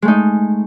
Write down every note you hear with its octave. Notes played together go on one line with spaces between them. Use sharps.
G#3 A3 D#4